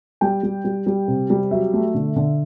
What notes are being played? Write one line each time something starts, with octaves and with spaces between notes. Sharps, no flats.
G3 G5
G3
G3
G3
C3
G3
F#3 E5
A3
D3
D3